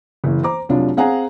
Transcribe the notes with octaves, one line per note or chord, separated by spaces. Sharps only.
F#1 E3
C5 A#5 D6
F1 C2 F#3 D4 F4
C4 G#4 F5 F#5 G#5 A#5